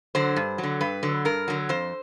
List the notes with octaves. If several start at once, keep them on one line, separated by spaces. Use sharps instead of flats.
D3 F#3 C5
G2
F#3
D3
G2 B4
D3 F#3
G2 A#4
D3 F#3
F2 C5